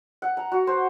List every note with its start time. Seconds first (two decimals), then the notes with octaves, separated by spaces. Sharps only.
0.22 F#5
0.37 A#5
0.52 F#4
0.67 C5